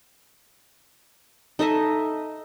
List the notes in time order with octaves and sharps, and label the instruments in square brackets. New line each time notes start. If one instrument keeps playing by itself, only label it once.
[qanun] D#4 A4 D#5 E5